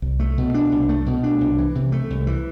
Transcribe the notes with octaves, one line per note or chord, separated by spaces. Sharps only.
C2
A3
B2
D4
C2
A3
B2
D4
C2
E3
C3
A3
C2
E3